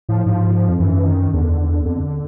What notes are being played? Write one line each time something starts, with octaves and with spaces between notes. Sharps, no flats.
A2 F3
G#2 F3
F2
F#2 E3
D#3
E2 D3
F2 D3